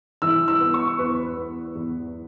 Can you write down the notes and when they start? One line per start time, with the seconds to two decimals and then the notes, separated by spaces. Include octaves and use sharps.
0.22 E3 E6
0.48 E6
0.61 B3
0.74 C#6
0.99 E2 B4
1.37 B3
1.75 E2